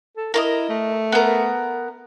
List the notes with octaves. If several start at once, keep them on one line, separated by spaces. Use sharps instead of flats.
A4
E4 A#4 D5 D#5
A3
B3 A#4